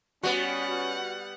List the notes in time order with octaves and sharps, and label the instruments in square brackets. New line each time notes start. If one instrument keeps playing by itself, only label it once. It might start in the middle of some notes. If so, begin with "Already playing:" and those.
[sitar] G3 B3 [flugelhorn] C#4 [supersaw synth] F#4 [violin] F#5